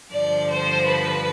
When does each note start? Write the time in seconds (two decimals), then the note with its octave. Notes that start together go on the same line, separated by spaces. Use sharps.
0.11 G2 D3 F3 D5
0.50 C5
0.86 B4